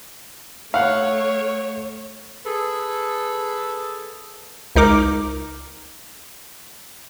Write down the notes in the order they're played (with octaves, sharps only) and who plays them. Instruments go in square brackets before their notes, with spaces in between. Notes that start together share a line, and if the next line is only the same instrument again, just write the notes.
[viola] A3 C#5 [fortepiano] F5 F#5
[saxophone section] G#4 A4 B4
[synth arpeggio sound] C#2 D#4 A#4 D6